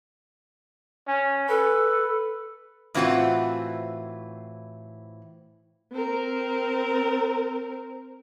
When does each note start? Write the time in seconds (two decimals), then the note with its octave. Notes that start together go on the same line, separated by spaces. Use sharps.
1.08 C#4
1.49 A4 B4
2.94 A2 E3 C4 F4 F#4 F#5
5.92 C4 A#4